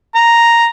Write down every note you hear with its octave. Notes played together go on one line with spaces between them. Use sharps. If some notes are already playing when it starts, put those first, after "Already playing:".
A#5